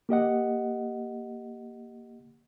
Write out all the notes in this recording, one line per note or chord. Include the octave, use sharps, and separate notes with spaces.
A#3 G4 D#5 F#5